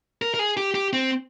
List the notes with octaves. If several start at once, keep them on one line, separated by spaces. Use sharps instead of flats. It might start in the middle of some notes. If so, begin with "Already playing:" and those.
A#4
A#4
G#4
G4
G4
C4